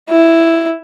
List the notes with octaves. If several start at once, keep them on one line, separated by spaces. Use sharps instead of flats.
E4